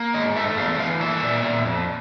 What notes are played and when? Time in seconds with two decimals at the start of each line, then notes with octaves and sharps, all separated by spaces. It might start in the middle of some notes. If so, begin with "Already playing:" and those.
Already playing: A#3
0.14 G#2 D#5
0.36 A3 E5
0.58 E2 F5
0.79 E3 F5
1.01 A#3 E5
1.23 A#2
1.44 A#2
1.65 F2